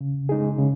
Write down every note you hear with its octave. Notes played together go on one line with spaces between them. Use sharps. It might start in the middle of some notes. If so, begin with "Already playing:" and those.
C#3
G#3 D#4 G#4
C#3